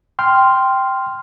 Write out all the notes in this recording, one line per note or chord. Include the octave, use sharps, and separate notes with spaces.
G5 C6 F6